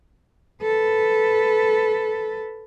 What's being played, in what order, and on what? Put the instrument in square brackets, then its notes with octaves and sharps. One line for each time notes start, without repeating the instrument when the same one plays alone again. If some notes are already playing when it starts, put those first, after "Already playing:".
[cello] A4 B4